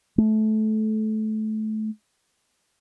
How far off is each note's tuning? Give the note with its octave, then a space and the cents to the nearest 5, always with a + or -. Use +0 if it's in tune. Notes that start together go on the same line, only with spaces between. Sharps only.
A3 -20